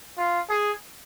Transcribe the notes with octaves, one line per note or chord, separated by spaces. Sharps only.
F4
G#4